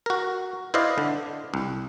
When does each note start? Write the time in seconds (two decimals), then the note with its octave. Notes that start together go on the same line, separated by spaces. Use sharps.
0.06 F#4 A#4
0.74 E4 B4 C5 D5 D#5 F5
0.98 D3
1.54 C2